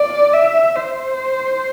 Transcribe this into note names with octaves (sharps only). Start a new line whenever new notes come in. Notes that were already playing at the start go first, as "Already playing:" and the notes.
Already playing: D5
E5
C5